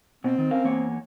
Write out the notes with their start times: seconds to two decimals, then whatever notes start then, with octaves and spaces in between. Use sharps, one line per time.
0.24 B2 C4
0.38 D#3
0.51 C#4 A#4 F5
0.64 E2 A#3 C#5